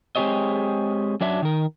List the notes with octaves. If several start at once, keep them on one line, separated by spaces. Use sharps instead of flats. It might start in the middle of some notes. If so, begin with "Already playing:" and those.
G#3 C4 G4 G#4 C#5 D#5
F#2 F#3 D4 E5
D#3 A#4